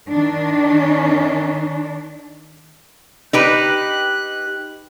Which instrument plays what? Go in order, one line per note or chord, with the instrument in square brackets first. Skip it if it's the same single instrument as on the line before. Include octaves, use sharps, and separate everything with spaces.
[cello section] D#3 D4
[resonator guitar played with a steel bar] D#4 G4 B4 [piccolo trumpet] F#6